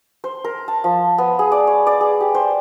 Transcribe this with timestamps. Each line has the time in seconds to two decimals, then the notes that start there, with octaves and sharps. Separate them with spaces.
0.24 C5
0.44 A#4
0.68 A5
0.84 F3
1.18 B3
1.39 G#4
1.52 D5
1.67 C#5
1.87 D5
2.01 G#4
2.21 G4
2.35 C5